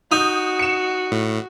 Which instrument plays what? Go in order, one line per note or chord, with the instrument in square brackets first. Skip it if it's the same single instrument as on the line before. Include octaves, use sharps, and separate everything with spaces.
[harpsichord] D#4 [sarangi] F#4 [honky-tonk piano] D#6 G6
[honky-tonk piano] C#7 E7
[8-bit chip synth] A2